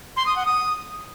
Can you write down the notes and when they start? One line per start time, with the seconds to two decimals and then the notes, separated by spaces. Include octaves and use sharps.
0.17 C6
0.26 D#6
0.36 F#5
0.46 D#6